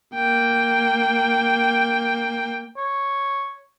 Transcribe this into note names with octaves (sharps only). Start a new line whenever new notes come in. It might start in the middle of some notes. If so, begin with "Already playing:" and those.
A#3 G5
C#5